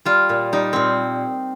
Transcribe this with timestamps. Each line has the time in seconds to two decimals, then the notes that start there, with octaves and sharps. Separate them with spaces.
0.05 G3 F4
0.29 A#2
0.53 G3 D#4
0.73 A#2 C4